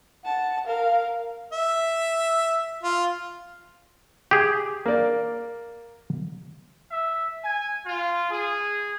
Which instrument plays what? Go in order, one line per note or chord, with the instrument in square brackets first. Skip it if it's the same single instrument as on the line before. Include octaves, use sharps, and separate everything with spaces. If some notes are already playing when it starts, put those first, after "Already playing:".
[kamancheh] F#5 A5
A#4 F5
[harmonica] E5
F4
[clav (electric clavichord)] G4 G#4
[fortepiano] A#3 D5
[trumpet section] E5
G#5
F4
G#4